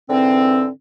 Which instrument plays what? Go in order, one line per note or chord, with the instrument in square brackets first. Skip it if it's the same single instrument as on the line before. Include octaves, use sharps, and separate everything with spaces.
[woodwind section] G#2 D3 E3 C4